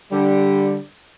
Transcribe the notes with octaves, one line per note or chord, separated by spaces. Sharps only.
D3 G3